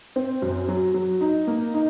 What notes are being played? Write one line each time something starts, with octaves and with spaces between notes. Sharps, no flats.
C4
F#2
F#3
F#3
D#4
A#3
D#4